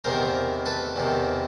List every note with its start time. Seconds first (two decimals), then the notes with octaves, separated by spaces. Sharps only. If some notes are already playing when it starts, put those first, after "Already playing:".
0.04 E2 C3 D#3 A#4 C5
0.66 A4 B4
0.96 E2 C3 D#3